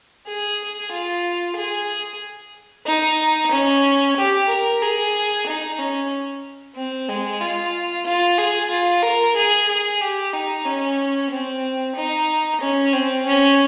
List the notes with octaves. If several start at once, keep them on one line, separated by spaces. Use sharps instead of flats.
G#4
F4
G#4
D#4
C#4
G4
A#4
G#4
D#4
C#4
C4
G#3
F4
F4
G#4
F4
A#4
G#4
G#4
G4
D#4
C#4
C4
D#4
C#4
C4
C#4